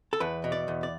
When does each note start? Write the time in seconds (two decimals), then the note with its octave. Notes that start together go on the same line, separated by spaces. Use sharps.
0.13 A4
0.20 E2 B4
0.44 B2
0.52 D5
0.68 E2
0.83 D5